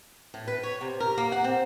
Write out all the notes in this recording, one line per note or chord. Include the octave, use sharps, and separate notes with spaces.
A2
B4
C#5
C3
A#4
A#3
F#5
C4